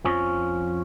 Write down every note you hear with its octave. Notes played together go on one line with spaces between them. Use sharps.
F2 F3 C#4